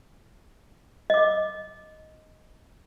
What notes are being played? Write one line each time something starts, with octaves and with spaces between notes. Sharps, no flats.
D#5 D6